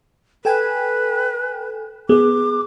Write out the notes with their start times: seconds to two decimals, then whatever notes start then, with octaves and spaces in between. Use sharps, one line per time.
0.45 A4 B4 G5 G#5
2.09 B3 G#4 D6